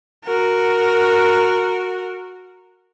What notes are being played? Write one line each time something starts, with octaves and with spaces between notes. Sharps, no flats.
F#4 A#4